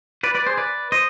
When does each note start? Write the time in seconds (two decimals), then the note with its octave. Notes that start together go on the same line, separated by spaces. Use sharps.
0.23 B4 D5
0.35 B4 D5
0.46 G#4 C5
0.57 B4 D5
0.92 C5 D#5